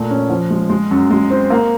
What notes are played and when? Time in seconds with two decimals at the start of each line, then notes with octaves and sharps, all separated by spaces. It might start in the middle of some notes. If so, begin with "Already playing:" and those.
Already playing: A#2 A3
0.10 C#4
0.30 F3
0.50 G#3
0.70 G#3
0.91 F#2
1.11 G#3
1.30 C4
1.50 A#3